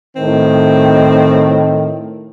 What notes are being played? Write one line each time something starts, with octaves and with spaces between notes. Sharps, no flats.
A2 D#3 C4